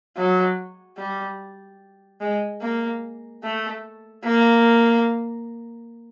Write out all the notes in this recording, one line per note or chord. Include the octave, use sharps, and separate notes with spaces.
F#3
G3
G#3
A#3
A3
A#3